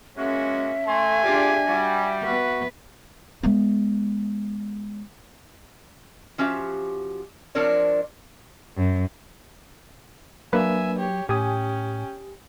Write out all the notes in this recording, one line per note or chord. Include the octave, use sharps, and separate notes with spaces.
G#3 A#3 C#4 F#4 E5
A3 G#5 C6
D4 F4 G4 G#4 D5
G3 F#4
B3 F#4 B4
G#3 B3
F3 C#4 F#4 G4 E5
F3 C4 D4 A#4 C#5 D5
F#2
F#3 A#3 D4 B4 E5 G#5
G4 C#5
A2 C#4 G4 G5 G#5 D#6